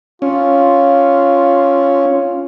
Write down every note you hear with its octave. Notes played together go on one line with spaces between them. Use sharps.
C#4 F4